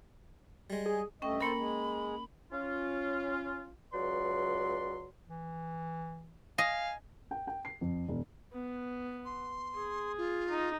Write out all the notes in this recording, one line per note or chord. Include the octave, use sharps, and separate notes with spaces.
G3 G#3
G#4
G2 A3 C#4 D#5 G5
A#2 A#3 A4 A#4 C5 B5
G#3
C#4 F4
C#2 F#3 B4 D5 C6
E3
D#5 F5 G#5
G5
G5
C7
F2
E1
B3
C6
G#4
F4
D#4